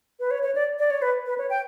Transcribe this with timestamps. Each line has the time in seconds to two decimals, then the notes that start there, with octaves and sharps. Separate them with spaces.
0.20 B4
0.31 C#5
0.43 C#5
0.55 D5
0.79 D5
0.90 C#5
1.02 B4
1.26 B4
1.38 C#5
1.50 G5